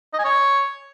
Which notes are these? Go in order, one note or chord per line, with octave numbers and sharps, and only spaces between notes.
D#5
G#5
C#5